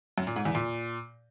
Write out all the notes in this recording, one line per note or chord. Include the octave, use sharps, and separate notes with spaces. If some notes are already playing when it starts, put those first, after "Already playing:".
F#2
A#2
G#2
E2
A#2